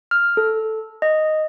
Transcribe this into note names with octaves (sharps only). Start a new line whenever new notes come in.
F6
A4
D#5